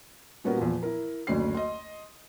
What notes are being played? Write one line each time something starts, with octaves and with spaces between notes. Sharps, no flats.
A#2 G3 B3 C#4 F#4 A#4
E2 A#2 F3
E4 A#4
F#1 D2 C#4 D5 C7
D#5 C6